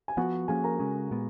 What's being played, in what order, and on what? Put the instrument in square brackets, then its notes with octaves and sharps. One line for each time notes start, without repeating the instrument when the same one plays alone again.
[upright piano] G#5
[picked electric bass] F3 B3 [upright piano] F#4 F#5
[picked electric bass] F3 A#3 C#4 [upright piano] G#4 G#5
[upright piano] A#4 A#5
[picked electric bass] C#3 G#3 C#4
A#2 G#3 B3